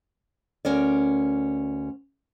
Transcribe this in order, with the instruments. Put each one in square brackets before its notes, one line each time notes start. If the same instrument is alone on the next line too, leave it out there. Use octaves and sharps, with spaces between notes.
[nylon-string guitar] D2 C#4 A#4 D5